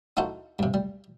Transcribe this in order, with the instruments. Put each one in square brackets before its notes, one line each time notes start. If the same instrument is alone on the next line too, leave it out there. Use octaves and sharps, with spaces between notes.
[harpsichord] D#4 E4 F#4 A4 C5
G2 C3
G3